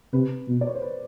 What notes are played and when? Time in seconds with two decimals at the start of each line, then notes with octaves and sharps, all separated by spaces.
0.13 C3 B4
0.48 B2
0.61 D5
0.67 C#5
0.75 C5
0.82 B4